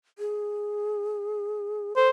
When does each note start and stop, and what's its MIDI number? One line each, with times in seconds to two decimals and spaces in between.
0.19 1.93 68
1.96 2.08 69
1.96 2.10 72